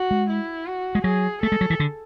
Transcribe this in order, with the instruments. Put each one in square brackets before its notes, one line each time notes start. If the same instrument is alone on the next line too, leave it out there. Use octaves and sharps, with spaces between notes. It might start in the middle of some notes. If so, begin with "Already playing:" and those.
Already playing: [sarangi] F#4
[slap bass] G#3
[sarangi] E4
F#4
[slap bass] G#3
[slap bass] F#3 [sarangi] G#4
[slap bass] A3 [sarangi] A4
[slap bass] G#3
F#3
E3
D3